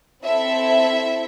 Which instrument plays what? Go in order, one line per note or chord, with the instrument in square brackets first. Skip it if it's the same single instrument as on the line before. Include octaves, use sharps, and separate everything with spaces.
[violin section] C4 E4 A4 E5